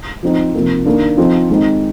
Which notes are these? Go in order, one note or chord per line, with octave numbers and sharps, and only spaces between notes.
F3 C4 D#4
C3 F3 A#3
D#3 A#3 D4
F3 C4 D#4
D#3 G#3 C4 D#4